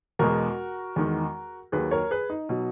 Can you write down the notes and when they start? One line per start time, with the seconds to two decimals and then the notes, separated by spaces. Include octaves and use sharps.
0.19 E2 B2 G#3 F#4 A#4
0.96 E2 D#3 G#3
1.72 D#2 D#3 F#3 G#4 B4
1.91 A#4 C#5
2.11 G#4 B4
2.30 D#4
2.49 B2 F#3